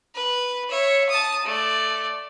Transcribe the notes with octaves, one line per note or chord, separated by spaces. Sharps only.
B4
C#5 E5
A5 D#6
A3 D5